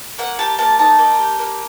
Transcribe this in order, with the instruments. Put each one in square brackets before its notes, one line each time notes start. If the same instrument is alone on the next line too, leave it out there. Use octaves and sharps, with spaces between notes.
[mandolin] A#3 F#5
G4 A5
A#3 A5
D#4 A5
A#3
G4
A#3